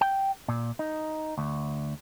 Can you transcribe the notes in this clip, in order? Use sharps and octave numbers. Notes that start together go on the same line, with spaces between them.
G5
A#2
D#4
D2